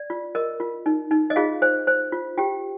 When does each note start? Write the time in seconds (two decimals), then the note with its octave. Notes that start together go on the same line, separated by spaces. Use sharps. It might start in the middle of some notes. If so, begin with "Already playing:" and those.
Already playing: D5
0.10 F4
0.35 A#4 D#5
0.60 F4
0.86 D#4
1.11 D#4
1.30 D#5
1.36 F4 G#4 F5
1.62 C5
1.87 C5
2.13 F4
2.38 F4 G4 G5